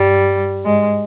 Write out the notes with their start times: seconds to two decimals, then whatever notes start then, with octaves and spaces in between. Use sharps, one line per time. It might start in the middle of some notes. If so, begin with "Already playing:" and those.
Already playing: G2 G3
0.65 G#2 G#3